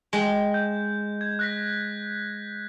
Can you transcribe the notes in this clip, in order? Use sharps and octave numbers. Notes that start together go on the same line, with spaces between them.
G#3 G5
G6
G#6
F#6 A#6 B6